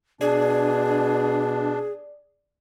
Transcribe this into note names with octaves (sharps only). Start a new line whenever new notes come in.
B2 D4 G#4 D5